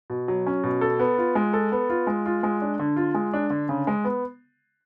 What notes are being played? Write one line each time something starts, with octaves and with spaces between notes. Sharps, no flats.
B2
F#3
C#4
B2
A4
B3
F4
G#3
A4
B3
F4
G#3
F4
G#3
D4
D3
F4
G#3
D4
D3
C#3
G#3
B3